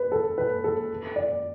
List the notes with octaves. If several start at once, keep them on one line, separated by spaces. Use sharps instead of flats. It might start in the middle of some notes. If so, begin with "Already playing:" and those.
Already playing: B4
A4
B4
A4
D5